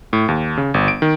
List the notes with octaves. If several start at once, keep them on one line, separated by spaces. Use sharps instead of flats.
A2
D#2
C#3
G1
D7
D#3